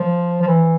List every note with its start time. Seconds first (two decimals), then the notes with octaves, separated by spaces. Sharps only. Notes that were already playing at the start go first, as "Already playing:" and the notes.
Already playing: F3
0.41 F3
0.47 E3